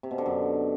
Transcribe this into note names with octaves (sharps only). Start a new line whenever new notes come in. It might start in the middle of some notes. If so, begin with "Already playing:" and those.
C3
B2
D3
F#2